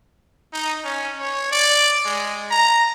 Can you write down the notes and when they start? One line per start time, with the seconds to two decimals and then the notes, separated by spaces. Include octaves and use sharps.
0.53 D#4
0.85 C#4
1.19 C#5
1.51 D5
2.05 G#3
2.51 A#5